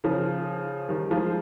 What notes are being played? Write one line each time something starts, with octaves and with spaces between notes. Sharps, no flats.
C#3 F3
D#3 G3
F3 G#3